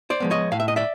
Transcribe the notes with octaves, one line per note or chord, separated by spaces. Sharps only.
C5 D5
F3 G#3 B3
C#5 D#5
A2 F5
E5
D#5
D5 E5